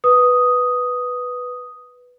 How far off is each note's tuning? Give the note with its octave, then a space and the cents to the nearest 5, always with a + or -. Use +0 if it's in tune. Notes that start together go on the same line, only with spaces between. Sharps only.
B4 +0 D#6 +0